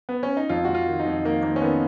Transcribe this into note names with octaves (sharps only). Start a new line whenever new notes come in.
B3
C#4
D#4
F2 F4
F2 F#4
F4
D#3
D#4
F2
D#3 A#3
D#3 A#3
C#4
D#3 B3